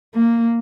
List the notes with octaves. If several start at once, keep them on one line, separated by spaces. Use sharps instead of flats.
A#3